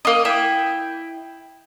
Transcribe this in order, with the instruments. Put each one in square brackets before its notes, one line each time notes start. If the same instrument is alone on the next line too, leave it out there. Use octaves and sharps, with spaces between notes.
[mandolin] A#3 D#5
E4 G5